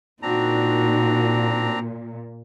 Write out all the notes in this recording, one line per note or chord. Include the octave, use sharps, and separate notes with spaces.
A#2 C4 D4 D#4 F#4 A#5